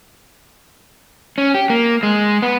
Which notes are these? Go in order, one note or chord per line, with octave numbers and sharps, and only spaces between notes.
C#4
G4
A#3
G#3
B3